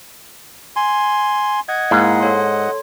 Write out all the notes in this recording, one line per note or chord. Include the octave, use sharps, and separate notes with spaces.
G#5 C6
D#5 F#5 G#6
G#2 A#3 E4 F5
A4 C#5 C6